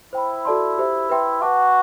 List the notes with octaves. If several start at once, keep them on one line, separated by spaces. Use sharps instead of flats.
E4 C5 G5 B5
F#4 A4 D5 A5 C6
G4 C5 E5
B4 E5 G5 C6
F#4 B4 F#5 A5 D6